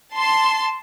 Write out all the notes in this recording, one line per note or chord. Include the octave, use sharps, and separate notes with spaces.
A5 C6